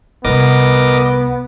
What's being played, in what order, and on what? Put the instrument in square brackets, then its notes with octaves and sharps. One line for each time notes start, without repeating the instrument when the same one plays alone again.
[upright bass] C2 [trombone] B3 [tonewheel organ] A#4 D#5 D6